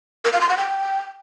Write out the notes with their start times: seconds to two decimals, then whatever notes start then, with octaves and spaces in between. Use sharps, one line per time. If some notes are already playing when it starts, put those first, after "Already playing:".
0.25 A#4
0.33 F5
0.41 C6
0.49 F#5
0.57 G5